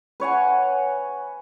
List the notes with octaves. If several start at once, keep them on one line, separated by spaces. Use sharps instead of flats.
B4 C#5 F#5 G#5